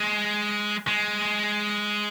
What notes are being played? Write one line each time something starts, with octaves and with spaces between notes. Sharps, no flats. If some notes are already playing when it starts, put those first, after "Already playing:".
Already playing: G#3
G#3